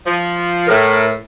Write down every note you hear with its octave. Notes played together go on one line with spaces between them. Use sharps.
F3
A2 A#4